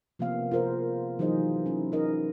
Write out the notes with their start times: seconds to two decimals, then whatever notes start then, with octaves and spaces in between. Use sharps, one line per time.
0.19 C3 F3 A#3 B3 F5
0.51 F4 G#4 A#4 C5
1.19 E3 F#3 D#4 G#4 C5 D#5
1.66 C#4 E4
1.92 D#4 E4 A#4 D#5